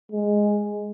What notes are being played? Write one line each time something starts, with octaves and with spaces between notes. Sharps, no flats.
G#3